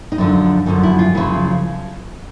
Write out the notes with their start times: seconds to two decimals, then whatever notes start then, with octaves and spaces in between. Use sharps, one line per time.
0.12 D#4
0.18 F#2 D3 F3 D4
0.66 F#2 D3 F3 D#4
0.83 E4
0.99 F4
1.15 F#2 C#3 F3 E4